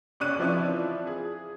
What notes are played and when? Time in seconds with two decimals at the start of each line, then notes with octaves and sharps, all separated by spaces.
0.20 C#2 C#4 D5 C#6 F#6 D#7
0.39 E3 F3 C4 E4 F4 D5
1.07 G#4